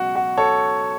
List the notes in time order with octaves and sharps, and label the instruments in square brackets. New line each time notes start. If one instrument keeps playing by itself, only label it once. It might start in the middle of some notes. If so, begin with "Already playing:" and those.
Already playing: [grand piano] C#2 B2 F#3 F#4
F#4
A4 C#5